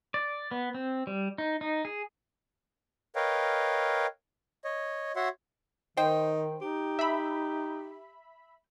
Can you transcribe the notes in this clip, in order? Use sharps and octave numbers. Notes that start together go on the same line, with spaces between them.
D5
B3
C4
G3
D#4
D#4
G#4
A#4 B4 C#5 D#5 F5 G5
C#5 D#5
F#4 C#5 E5 F#5 C6
D#3 D#4 C5 G5
D#4 G4
E5 B5